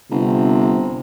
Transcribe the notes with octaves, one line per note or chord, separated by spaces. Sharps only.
G1 C3